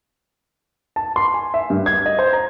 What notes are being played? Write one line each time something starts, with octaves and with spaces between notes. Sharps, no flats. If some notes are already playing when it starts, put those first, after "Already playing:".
A5
C6
G#5
E5
G2
G#6
D#5
C5
A#5